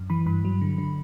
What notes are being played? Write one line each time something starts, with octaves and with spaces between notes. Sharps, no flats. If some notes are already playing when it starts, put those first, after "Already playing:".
Already playing: F#2
E3 B5
G2 B5
F#3
D3
D3